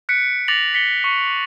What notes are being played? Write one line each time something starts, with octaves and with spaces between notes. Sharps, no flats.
F#6 B6 C#7 D7
D6 A6 A#6 F7 F#7
B6 C#7 G7
C#6 C#7